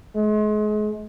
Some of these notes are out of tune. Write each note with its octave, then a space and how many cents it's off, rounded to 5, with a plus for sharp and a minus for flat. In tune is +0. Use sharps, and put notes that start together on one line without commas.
G#3 +35